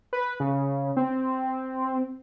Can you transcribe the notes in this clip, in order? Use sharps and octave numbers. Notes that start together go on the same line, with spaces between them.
B4
C#3
C4